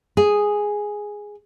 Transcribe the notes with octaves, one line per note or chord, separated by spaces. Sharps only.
G#4